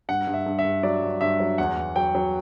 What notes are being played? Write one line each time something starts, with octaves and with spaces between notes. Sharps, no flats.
G2 F#5
G2
E5
G2
E5
G2
F#3 D5
G2
G2 E5
F#3
E2 F#5
E2
F#3 G5
F#3